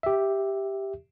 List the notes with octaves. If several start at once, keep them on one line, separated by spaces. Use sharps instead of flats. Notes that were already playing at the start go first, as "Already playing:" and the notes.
G4 E5